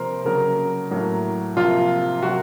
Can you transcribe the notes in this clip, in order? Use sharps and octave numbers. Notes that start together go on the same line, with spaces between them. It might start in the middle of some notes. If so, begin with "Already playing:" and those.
Already playing: C3 F3 A#3 A#4 C5
C#3 F#3 A#3 A#4
A2 F#3 A#3
C3 F3 A#3 F4
C3 F#3 A#3 F#4